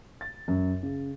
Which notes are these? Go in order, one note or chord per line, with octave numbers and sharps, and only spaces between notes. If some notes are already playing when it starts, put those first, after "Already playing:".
A6
F#2
C#3